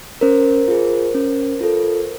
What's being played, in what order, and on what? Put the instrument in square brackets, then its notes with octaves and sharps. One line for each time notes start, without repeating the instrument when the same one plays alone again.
[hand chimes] C#4 A#4 C5
F4 G#4
C#4
F4 A4